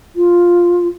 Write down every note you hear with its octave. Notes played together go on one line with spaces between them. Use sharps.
F4